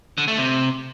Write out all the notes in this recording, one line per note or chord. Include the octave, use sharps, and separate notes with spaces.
D3
A3
C3